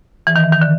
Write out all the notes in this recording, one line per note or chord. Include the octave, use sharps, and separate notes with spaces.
E3
D#3
E3
D#3
D3